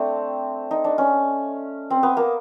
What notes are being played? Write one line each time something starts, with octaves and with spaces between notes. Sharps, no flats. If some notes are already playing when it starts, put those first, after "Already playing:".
Already playing: A3 C4 D4
D#4
D4
C#4
C4
B3
A#3